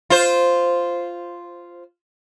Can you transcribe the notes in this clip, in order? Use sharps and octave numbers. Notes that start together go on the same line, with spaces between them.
F4 C5